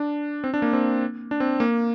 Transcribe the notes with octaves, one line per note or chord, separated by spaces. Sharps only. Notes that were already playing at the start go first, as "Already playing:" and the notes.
Already playing: D4
C4
D4
A#3
C4
D4
C4
A#3